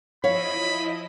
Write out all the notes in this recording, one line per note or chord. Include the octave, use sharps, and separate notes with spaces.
F3 E4 C#5 D#5 F5 B5